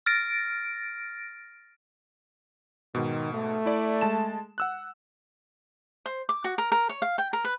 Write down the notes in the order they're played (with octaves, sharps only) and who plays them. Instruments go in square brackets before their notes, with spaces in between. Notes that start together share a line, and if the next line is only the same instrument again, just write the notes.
[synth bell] F6 A6 A#6 D7
[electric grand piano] G#2 B2 [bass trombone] D#3
[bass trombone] A3
[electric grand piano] E4 D5
G#3 A5 E7
F#5 E6 F#6
[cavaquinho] C5
D6
F#4
A#4
A#4
C#5
F5
G5
A#4
B4